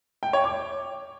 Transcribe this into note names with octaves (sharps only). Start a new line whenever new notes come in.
G5
C#5
D6